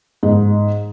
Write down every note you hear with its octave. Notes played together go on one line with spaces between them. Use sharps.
G#2